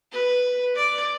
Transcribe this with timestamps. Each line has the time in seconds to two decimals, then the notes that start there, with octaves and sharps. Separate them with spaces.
0.12 B4
0.76 D5